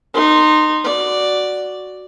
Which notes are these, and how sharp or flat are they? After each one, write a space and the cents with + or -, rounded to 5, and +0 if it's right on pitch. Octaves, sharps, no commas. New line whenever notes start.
D#4 -20 C6 +0
F#4 +0 D5 +0